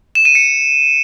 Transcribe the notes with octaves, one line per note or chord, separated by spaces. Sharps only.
E7
D#7
C#7